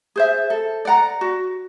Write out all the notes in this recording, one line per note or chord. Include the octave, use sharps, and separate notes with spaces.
G#4 C5 E5
A4
D5 F#5 A#5
F#4